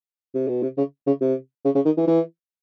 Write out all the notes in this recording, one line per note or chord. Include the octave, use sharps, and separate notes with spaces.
C3
B2
C3
C#3
C#3
C3
C#3
C#3
D#3
E3
E3